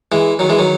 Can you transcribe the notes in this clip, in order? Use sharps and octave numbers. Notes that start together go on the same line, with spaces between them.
E3 G#3
D#3 F#3
E3 G#3
D#3 F#3